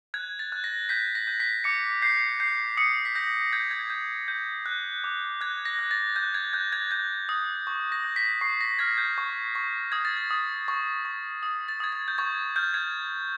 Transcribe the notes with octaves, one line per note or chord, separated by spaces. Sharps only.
F#6 G#6
A6
F#6
A#6
G6 B6
A#6
G6
B6
D6 C#7
G6 C7
G6 C7
D#6 C#7
B6
G6 A#6
G6 G#6
G#6
G6
G6
F#6
D6
F#6 G#6
A#6
F#6
A6
F#6 G6
G#6
F#6 G6
G#6
G6 G#6
D#6
C#6
A#6
G6
B6
C#6 C7
A#6
F6 G#6
G6
C#6
C#6
D#6 G#6
A6
G#6
D#6
C#6
C#6
D#6
A6
D#6 G#6
A6
G6
C#6 G#6
F6 G6
G#6